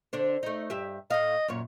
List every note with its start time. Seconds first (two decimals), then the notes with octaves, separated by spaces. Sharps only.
0.13 D3 D4 C5
0.43 A3 D#4
0.70 G2 G4 E5
1.10 A2 D#5 F5
1.48 F#2 A#2 C#5